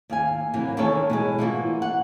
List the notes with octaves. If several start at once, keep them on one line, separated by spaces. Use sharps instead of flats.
D#2 F5 G#5
C3 E3 F#3 A#3
D#2 D#3 E3 C#4 A4 C#5
B2 E3 G#3
E3 A#3 F4 F#4
F#5